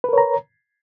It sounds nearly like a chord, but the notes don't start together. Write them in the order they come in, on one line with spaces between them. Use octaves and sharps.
B4 A#4 C#5 A#5